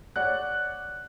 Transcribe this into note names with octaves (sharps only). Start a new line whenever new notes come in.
C#5 D5 F#5 F#6